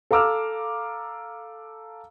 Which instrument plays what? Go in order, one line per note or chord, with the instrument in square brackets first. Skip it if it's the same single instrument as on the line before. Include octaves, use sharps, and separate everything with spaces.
[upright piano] A4 F5 A#5 D6 E6 F6